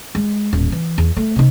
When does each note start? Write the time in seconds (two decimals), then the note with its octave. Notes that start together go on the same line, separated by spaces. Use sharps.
0.15 G#3
0.53 D#1 A1
0.72 E3
0.98 E2
1.16 A3
1.36 C3 D#4